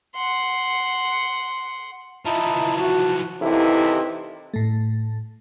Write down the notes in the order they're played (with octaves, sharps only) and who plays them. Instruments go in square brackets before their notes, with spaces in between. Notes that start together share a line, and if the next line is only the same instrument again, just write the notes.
[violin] F#5 C6
[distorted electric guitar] E3 F3 [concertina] D#4 E4 A5
[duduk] F#4 [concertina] A5
[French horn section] D#2 C3 E3 D#4 E4 A4
[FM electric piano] A2 A3